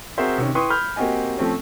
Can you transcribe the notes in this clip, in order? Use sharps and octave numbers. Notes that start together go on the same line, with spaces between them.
C4 F#4 G#4 A#4 C5 E5
C3 D#3 C#4
E4 B4 G5 C6 C#6 D#6
B5 F6 G6
A#3 C4 F#4 G4 D#5 G#5
F3 A3 C4 C#4